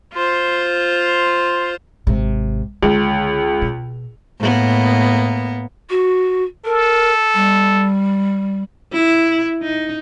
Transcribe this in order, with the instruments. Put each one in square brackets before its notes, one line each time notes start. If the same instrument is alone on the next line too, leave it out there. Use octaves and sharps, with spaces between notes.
[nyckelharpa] F4 C5
[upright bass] G#1 C3
[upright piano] C#2 [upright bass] D3
[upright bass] B2
[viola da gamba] A2 A#3 B3
[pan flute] F#4
[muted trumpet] A4 [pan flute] A#4
[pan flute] G3
[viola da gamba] E4
D#4